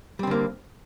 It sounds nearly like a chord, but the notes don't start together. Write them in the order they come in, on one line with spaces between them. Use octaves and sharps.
G3 C4 D3 A#3